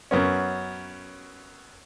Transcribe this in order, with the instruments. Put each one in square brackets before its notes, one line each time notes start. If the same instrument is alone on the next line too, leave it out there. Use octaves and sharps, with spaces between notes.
[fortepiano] F#2 B3 C#4